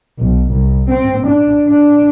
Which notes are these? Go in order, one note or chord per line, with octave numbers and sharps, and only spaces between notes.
B1
C2
C4
D4
D4